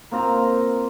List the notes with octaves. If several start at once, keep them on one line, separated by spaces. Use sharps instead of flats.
A#3 C4 F4 A#5